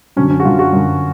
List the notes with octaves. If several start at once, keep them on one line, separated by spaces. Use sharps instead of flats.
F#2 D3 F#3 C#4
C#4
F#4
F#2 D3 F#3 F4
F#4
F#2 D3 F#3